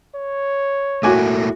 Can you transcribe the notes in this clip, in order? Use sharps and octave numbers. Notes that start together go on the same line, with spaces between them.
C#5
A3 A#3 E4 F#4 G#5 D6